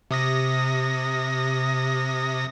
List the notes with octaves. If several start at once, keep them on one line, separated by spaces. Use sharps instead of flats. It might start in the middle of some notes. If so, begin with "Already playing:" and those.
C3 D#6 A#6